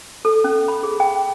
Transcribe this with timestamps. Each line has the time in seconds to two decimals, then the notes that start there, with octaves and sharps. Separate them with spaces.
0.25 A4
0.44 C#4
0.68 B5
0.83 G#4
1.00 G5